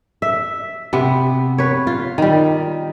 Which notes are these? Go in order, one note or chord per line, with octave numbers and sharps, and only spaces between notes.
E5
C3 B3
B4 C#5
F4
D#3 G3